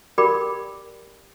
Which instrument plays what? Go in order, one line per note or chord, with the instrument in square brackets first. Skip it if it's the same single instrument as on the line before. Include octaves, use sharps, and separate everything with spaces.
[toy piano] G4 A#4 D5 G5 B5 D6